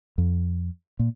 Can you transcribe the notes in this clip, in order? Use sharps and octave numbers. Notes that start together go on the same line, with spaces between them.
F2
A#2